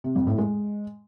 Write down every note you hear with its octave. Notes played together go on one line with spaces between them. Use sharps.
C3
F2
A2
G#3